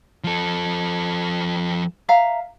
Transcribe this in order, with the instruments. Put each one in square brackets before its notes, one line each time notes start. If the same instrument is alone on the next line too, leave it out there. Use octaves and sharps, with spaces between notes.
[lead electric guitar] F3 A4
[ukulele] E5 F5 A#5